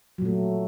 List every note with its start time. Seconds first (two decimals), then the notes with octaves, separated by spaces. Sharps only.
0.18 F#3
0.22 A#2
0.25 A3